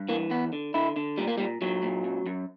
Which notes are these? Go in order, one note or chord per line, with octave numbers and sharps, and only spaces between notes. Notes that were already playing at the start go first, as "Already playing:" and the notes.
Already playing: G2
E3 A#3
E2 B3
D3
D3 E4
D3
A#2 G3
A#3
A#2 G3
A#2 F#3
A#2
F#2
F#2